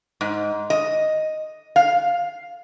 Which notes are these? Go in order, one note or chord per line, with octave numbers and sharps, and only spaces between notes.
G#2
D#5
F5